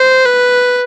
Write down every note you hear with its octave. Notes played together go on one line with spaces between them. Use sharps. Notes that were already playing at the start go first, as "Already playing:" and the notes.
Already playing: C5
B4